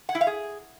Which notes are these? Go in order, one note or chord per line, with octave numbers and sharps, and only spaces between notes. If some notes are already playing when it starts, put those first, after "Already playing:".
F#5
E4
F5
G#4